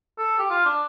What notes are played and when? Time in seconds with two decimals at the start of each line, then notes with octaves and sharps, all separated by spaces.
0.18 A4
0.38 G4
0.50 F4
0.65 D4